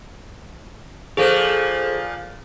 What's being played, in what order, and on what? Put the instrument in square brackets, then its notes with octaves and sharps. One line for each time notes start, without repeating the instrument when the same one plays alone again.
[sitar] A#2 F3 [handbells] G#4 A4 C5